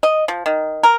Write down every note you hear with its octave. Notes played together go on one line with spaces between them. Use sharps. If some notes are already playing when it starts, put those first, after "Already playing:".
D#5
F3
D#3
A#4